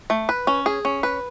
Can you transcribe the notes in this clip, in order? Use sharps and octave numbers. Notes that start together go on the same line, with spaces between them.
A3
B4
C#4
G#4
C#4
B4